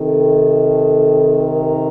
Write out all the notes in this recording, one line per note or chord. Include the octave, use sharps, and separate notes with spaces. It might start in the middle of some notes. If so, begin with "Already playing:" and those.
Already playing: C3 D#3 A4
A#4